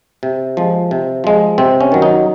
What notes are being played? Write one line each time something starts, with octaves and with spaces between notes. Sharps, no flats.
C3
F3 G#3
C3
F3 G#3
C3 C4
C#4
D#3 F#3
D#4